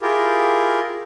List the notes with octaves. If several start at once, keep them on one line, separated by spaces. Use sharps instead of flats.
E4 F4 G4 G#4 A#4